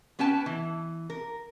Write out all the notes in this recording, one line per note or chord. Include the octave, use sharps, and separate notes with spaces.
B3 C#4 B4 G5 A5
E3
A#4